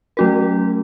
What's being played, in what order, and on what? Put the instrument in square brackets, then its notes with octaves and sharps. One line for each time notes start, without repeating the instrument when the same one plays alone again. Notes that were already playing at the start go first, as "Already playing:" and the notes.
[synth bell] F#3 A3 C#4 F#4 A#4